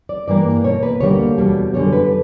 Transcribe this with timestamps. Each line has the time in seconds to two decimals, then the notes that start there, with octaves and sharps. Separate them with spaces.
0.09 D5
0.28 G2 E3 A#3 D5
0.64 B2 A#3 C#5
0.83 B4
1.00 D2 D3 G3 A#3 C#5
1.38 E2 B2 G3
1.74 F#2 D3 G3 C#5
1.93 B4